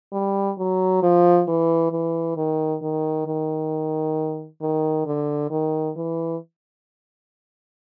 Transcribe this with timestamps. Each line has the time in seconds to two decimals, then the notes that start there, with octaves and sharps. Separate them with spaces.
0.12 G3
0.58 F#3
1.03 F3
1.48 E3
1.92 E3
2.36 D#3
2.82 D#3
3.27 D#3
4.61 D#3
5.06 D3
5.50 D#3
5.96 E3